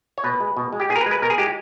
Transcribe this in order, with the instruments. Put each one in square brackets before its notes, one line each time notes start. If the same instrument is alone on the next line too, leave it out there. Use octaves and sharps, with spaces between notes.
[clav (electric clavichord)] C#5
B2 B4
G#3
B2
G#3
G4
B2 G#4
A#4
B4
G#3
B4
B2 A#4
G#4
G#3 G4